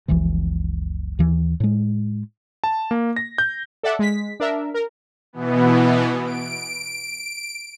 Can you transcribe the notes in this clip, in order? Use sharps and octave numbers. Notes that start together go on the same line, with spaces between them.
F#1 C#2 E3 F3
D#2 E3
A2 G#3
A5
A#3
A#6
G6
A4 D5 E5 F#5
G#3 B6
D4 A#4 E5
A#4
B2 E3 B3
D7